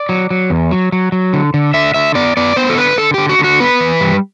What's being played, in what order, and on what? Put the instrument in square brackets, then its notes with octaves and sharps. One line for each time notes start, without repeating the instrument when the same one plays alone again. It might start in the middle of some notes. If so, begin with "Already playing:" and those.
Already playing: [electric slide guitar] D5
F#3
F#3
E2
F#3
F#3
F#3
D3
D3
D3 E5
D3 E5
B3 D5
B3 D5
B3 C5
A4
D3 B4
D3 A4
D3 G4
F#4
D3
F#4
B3 B4
E3
G3